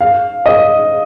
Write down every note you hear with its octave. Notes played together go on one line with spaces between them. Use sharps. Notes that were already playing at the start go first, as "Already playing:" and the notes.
F5
D#5